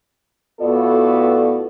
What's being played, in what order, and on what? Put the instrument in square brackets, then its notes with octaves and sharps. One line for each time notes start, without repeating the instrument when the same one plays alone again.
[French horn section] A2 B3 F4 F#4 A4 D5